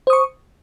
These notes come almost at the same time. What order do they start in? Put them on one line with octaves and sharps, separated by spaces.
C5 D#6 C#6